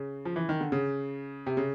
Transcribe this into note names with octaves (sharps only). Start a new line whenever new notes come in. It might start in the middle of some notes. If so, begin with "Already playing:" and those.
Already playing: C#3
F3
E3
D#3
D3
C#3
C3
C#3